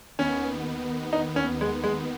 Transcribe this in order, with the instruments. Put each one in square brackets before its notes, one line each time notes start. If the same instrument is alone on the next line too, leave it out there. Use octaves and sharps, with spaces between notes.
[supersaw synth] D#2 D#3 B3 [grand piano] C#4
[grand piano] D#4
C#4
G#3
G#3